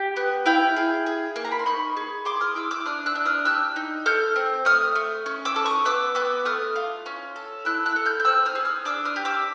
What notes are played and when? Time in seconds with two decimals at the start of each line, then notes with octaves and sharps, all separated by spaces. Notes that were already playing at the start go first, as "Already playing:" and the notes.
Already playing: G4
0.16 B3
0.46 E4 F5 G5
0.76 G#4
1.06 G#4
1.36 A#3
1.45 A#5
1.52 B5
1.59 C6
1.66 D#4 B5 C#6
1.97 G#4
2.25 G#4 C6 D6
2.41 D#6 F6
2.55 E4 D6 E6
2.71 D6 E6
2.85 D4 D#6 F6
3.06 E6 F#6
3.15 D4
3.25 D#6 F6
3.45 G4 E6 F#6
3.76 D#4
4.06 A4 F6 G6
4.36 C4
4.65 A3 D#6 F6
4.95 A3
5.26 C#4
5.45 D6 E6
5.56 A4
5.66 C#6 D#6
5.85 B3 D6 E6
6.15 B3 D6 E6
6.45 A3 D#6 F6
6.76 F4
7.06 C#4
7.36 A4
7.65 E4 E6 F#6
7.86 E6 F#6
7.96 A4
8.05 F6 G6
8.20 G6
8.25 C4 E6 F#6
8.46 D#6 F6
8.55 G#4
8.65 D#6 F6
8.85 D4 D6 E6
9.05 D#6 F6
9.16 G4
9.25 D6 E6